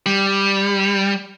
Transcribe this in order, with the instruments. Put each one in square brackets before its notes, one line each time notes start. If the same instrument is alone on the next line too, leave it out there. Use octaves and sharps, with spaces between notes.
[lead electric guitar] G3